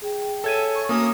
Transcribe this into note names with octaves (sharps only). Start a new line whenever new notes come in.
G#4 G5
A4 C#5 E5 G#5 G#6 D#7
C#6
A#3 C#4 F#4 A#4 D#6